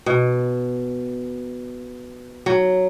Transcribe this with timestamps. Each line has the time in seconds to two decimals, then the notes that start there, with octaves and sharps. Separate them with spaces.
0.06 B2
2.46 F#3